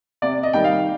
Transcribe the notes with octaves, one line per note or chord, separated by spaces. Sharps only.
C3 D5
D#5
D#3 G3 G5
F5